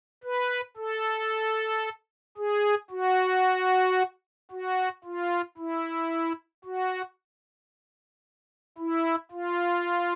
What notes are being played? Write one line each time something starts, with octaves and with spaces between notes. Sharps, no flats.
B4
A4
G#4
F#4
F#4
F4
E4
F#4
E4
F4